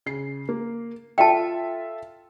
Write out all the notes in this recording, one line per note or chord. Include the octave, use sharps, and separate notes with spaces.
C#3 C7
A#3
F4 A4 E5 G5 A5